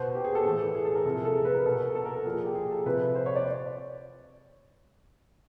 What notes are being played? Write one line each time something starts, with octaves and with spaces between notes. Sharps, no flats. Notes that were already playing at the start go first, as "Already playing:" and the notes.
Already playing: B2 C5
G4
G#4
A4
A2 E3
G#4
A4
A#4
C3 F3 A4
G#4
A4
A#4
B4
A#4
B2 A4
A4
A#4
A4
A#2 F3 G#4
G4
G#4
A4
C3 F3 B4
C5
C#5
D5